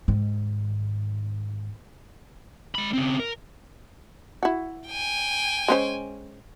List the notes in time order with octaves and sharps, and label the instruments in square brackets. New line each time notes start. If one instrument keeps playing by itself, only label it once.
[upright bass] G#2 D#3
[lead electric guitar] G#3 B5
C#3 C4
A#4
[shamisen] E4 F#4
[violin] G5 G#5
[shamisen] G#3 C#4 C5